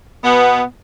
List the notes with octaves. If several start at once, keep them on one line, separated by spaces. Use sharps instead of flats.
B2 B3